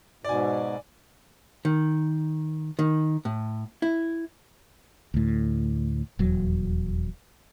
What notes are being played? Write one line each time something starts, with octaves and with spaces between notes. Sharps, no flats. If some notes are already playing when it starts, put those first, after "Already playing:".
G#2 B2 D5 G#5
D#3
D#3
A2
E4
D2 A2
D#1 E2 F#3